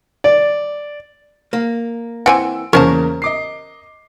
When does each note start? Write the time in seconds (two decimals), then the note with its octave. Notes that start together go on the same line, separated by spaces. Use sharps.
0.24 D5
1.53 A#3
2.26 E3 C4 F#5 G#5 E6 D7
2.73 E2 C#3 A#3 C#4 A#4 C5 A5 C#6
3.22 D#5 D6 C7